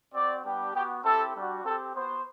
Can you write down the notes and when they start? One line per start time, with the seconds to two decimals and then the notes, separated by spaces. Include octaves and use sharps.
0.14 C4 F#4 D5
0.44 G3 B3 D4 G4
0.74 B3 F#4 G4
1.03 C4 E4 G4 A4
1.35 G3 D4 F#4
1.64 C4 G4 A4
1.95 B3 F#4 C5